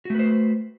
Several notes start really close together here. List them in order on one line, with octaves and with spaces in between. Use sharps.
F#4 A3 B4 C5